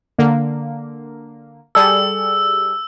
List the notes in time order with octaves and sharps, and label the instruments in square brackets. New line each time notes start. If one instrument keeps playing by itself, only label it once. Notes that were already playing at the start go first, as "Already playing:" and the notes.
[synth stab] D3 A#3
[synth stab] G3 G#4 A4 [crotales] E6